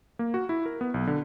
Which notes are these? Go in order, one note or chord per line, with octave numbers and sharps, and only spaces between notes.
A#3
F#4
E4
A#4
B3
B1
D3